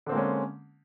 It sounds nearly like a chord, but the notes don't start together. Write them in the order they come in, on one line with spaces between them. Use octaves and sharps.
D3 C4 A#3 G#3 C#4